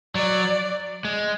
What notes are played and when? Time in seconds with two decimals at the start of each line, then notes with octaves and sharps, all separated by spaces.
0.15 F#3 D5
1.05 G#3